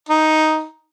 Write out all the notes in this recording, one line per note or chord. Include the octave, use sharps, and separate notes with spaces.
D#4